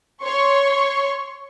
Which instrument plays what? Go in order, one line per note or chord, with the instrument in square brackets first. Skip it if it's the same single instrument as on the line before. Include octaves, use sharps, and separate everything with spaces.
[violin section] C#5 C6 C#6